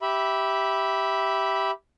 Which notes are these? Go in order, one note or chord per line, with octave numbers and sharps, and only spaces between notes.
G4 E5 B5